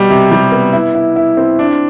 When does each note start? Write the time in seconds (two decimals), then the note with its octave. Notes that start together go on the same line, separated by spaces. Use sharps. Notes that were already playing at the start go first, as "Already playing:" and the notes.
Already playing: B2 G3
0.10 C3
0.32 G3
0.52 B3
0.73 E4
0.94 E4
1.16 E4
1.37 C4
1.59 D4